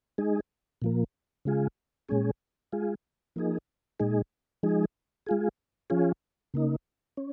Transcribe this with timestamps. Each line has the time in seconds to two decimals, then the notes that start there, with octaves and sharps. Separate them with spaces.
0.18 G#3 D#4 G#4
0.82 A#2 F3 A#3
1.45 C#3 G#3 F4 G#4
2.09 A#2 G#3 C#4 G#4
2.72 G#3 F4 G#4
3.36 F3 A#3 D#4 G#4
4.00 A#2 G#3 D#4 G#4
4.63 F3 G#3 D#4 G#4
5.26 G#3 F4 G#4
5.90 F3 C#4 F4 G#4
6.54 C#3 A#3 D#4
7.17 C#4